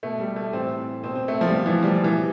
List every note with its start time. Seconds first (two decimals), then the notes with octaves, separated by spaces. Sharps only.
0.03 B2 A3
0.20 G3
0.36 A3
0.53 A2 E3 C4
1.04 B2 C4
1.15 C4
1.28 A3
1.41 F3
1.48 G3
1.53 B2 F3
1.66 E3
1.70 F3
1.83 G3
1.87 F3
2.03 B2 E3